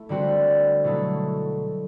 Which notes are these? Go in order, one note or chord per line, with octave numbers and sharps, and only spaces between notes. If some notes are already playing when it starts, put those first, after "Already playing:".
Already playing: A3 E4
D3 G3 C4 F#4 C5
B2 F#3 A3 E4 A4